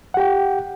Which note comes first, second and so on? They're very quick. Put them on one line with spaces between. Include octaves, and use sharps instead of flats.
F#5 G4 G5